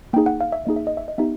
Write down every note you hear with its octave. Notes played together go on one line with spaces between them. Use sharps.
A#3 D#4 G#4 G5
F#5
F5
E5
A#3 D#4 G#4 D#5
E5
D#5
E5
D#5
B3 D#4 G4 E5